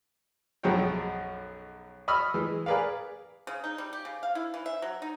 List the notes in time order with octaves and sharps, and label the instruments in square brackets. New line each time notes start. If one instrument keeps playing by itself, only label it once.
[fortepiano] B1 F#2 F3 G#3 C#5 G5
D#5 B5 C#6 E6 F6
E3 G#3
G#4 A#4 B4 D5 F5
[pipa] C#3
D#4
G3
G4
C#3
F5
E4
E3
E5
F#3
D#4